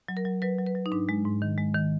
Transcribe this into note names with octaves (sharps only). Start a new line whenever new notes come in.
F#3
A#4
F#3
F#3 B4
F#3
B4
F#3
D#4
G#2 D4
G#3
G#2
D#3
G#3
D#3